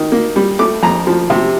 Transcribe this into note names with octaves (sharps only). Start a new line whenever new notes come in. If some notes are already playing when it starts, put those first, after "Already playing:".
Already playing: D#3
A#3
G3
A3 D6
F2 A#5
F3
C3